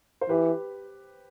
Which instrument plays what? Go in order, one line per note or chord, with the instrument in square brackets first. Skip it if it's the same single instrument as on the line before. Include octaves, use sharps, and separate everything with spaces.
[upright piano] C5
[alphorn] E3 [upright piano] G4 B4